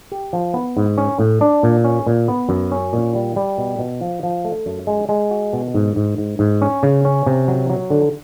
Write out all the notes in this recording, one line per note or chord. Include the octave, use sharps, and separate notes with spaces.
G4
F3
B3
G#2
C#4
A2
D4
A#2
C#4
A#2
B3
F#2
C#4
A#2
G3
G3
B2
B2
F3
F3
A3
F#2
G#3
G#3
F#4
B2
G#2
G#2
G#2
G#2
C#4
C#3
C#4
C3
F#3
F#3
D3